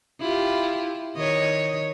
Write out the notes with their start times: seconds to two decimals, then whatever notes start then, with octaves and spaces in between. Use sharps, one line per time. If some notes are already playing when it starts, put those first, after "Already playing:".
0.20 E4 F4 G4
1.16 D#3 C#5 D#5